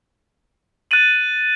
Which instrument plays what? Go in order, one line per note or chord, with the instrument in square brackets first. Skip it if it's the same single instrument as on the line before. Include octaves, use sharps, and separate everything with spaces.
[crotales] F#6 A6 D#7 F#7